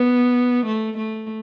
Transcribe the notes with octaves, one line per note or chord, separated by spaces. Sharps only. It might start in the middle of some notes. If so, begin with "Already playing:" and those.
Already playing: B3
A3
A3